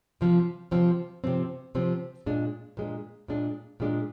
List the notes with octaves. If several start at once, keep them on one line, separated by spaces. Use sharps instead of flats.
C3 F3 C4
C3 F3 C4
C3 F3 C4
C3 F3 C4
A#2 G#3 D4
A#2 G#3 D4
A#2 G#3 D4
A#2 G#3 D4